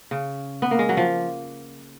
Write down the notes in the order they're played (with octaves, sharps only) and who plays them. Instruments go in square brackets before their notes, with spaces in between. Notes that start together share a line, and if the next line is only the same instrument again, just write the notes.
[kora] C#3
B3
A#3
G#3
F#3
F3